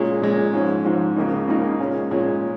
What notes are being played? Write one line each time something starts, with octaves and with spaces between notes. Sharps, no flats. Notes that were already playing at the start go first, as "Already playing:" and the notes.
Already playing: A#2 G#3 C#4
A#2 G#3 C#4
G#2 F3 C#4
G#2 F3 C#4
C#2 C#3 A#3 D#4
C#2 C#3 A#3 D#4
A#2 G#3 C#4
A#2 G#3 C#4